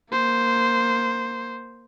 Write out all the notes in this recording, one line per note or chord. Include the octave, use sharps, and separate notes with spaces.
A#3 C5